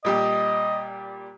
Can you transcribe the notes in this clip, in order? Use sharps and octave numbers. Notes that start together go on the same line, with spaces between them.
A#2 G3 G4 D#5